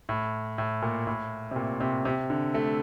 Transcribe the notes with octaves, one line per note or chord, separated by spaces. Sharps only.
A2
A2
A#2
A2
C3
A#2
C3
C3
D3
A3